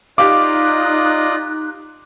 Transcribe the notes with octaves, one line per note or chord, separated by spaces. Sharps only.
D#4 F4 G4 D5 D#5 F5 D6 F#6